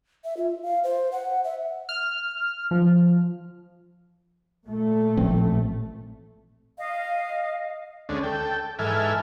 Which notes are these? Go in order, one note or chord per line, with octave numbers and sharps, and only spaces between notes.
E5
F4
F5
C5
F#5
E5
F6
F3
A#2 A3
A1 F3 C4
D#5 F5
D2 G#3 C#4 D4
A4 G5
G#2 E3 A4 E5 G#5 F6